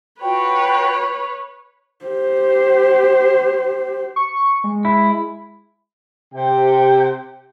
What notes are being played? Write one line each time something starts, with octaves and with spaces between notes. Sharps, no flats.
F4 F#4 B4 C#5 G5
G4 C5
C#6
G#3
E4
C3 G5